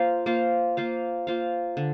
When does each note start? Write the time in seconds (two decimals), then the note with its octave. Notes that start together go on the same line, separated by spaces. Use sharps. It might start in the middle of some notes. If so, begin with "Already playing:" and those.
Already playing: A#3 F4 C5 F5
0.26 A#3 F4 C5 F5
0.77 A#3 F4 C5 F5
1.27 A#3 F4 C5 F5
1.77 D3